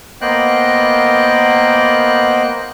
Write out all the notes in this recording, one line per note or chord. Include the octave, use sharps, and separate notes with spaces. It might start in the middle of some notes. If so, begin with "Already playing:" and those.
A#3 B3 C5 D#5 G5 F#6